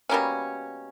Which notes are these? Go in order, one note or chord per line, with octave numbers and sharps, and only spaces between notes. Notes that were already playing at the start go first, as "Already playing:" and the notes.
B2 G3 A#3 C#4